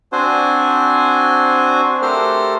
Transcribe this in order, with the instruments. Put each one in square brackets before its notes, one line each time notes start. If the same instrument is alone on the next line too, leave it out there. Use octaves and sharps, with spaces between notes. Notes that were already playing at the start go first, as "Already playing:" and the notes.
[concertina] C4 D4 F#4 C5 G#5
A3 G4 A4 A#4 C5 F6